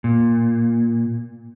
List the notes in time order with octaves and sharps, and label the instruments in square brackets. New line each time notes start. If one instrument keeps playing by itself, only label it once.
[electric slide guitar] A#2